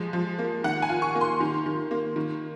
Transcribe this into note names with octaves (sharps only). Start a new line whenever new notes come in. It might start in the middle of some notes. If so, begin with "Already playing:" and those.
Already playing: F3 G#3
F3
A#3
D#3 F#5
G#5
F4
C#6
A#3
C6
D#3
D#3
A#3
D#3